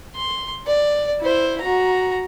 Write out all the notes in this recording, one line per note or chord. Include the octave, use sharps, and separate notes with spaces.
C6
D5
E4 C5
F#4 A#5